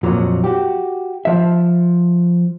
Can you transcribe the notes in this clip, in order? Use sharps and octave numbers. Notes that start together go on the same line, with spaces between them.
F2 A#2 F#3
F#4 G4
F3 E5